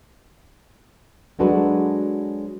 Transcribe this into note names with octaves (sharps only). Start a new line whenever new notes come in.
F#3 G#3 D4 F#4 A4 B4